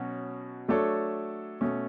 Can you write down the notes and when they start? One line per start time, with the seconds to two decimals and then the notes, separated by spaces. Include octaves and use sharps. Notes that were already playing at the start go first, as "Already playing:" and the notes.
Already playing: B2 F#3 C#4 F#4
0.68 F#3 A3 D4 A4 C#5
1.61 B2 A3 C#4